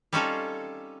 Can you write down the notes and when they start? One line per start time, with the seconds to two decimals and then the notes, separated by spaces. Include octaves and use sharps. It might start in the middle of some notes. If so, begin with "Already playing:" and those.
0.13 G3 C4 C#4 D#4 F4 A4